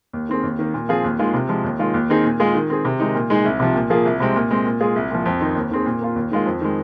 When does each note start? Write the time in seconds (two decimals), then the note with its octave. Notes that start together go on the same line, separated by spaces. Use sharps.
0.13 D#2
0.29 D#3 C4 G#4
0.44 D#2
0.59 D#3 A#3
0.74 A#2
0.89 F3 C4 F4 G#4
1.04 D#2
1.19 D#3 G#3 F4 G#4
1.34 C3
1.49 F3 G#3
1.64 D#2
1.79 D#3 G#3 F4
1.94 D#2
2.09 D#3 C4 D#4 G#4
2.25 A#2
2.40 G#3 F4 G#4
2.55 D#3
2.70 C4 G#4
2.85 C3
3.00 D#3 G#3 D#4
3.15 A#2
3.30 G#3 D#4 G#4
3.45 C2
3.60 C3 F3
3.75 A#2
3.90 F3 A#3 F4 G#4
4.05 C2
4.20 C3 G#3 C4
4.36 A#2
4.51 G#3 C4
4.66 A#2
4.81 G#3 F4 G#4
4.96 C2
5.11 A#2 F3
5.26 F2
5.41 D#3 C4 D#4
5.56 D#2
5.71 D#3 C4 G#4
5.86 A#2
6.01 A#3 F4
6.16 D#2
6.31 D#3 G#3 F4
6.46 F2
6.61 D#3 G#3